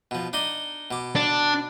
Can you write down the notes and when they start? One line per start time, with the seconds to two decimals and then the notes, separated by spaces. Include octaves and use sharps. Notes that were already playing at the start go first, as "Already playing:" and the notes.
0.11 B2 F3
0.33 D4 D#4 D#5
0.91 B2 D6
1.16 D4